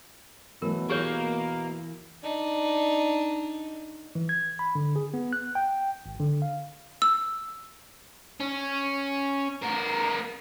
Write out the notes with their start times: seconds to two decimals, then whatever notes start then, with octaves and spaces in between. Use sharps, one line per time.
0.62 B2 E3 F#3 A3 A#4
0.90 E2 E3 A#3 G4 G#4 C#5
2.23 D4 D#4
4.15 E3
4.29 G#6
4.59 B5
4.75 D3
4.96 G#4
5.14 B3
5.33 F#6
5.55 G5
6.06 G#1
6.20 D3
6.42 F5
7.02 E6
8.40 C#4
9.62 B3 A#4